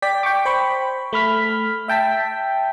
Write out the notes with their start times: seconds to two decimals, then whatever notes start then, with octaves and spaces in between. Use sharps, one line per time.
0.02 D5 G5 B6
0.23 G5 C#6 D6
0.45 C5 G5 B5 C#6
1.13 A3 B5 F6 B6
1.88 E5 G5 A5 B6